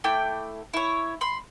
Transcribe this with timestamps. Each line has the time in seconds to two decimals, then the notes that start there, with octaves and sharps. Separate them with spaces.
0.04 A3 E4 G5 D6
0.74 E4 C#5
1.21 B5 C6